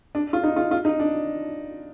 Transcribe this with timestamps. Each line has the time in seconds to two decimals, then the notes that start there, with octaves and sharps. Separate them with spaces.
0.15 D4
0.33 F4
0.43 D#4
0.56 F4
0.71 F4
0.85 D#4
1.00 D4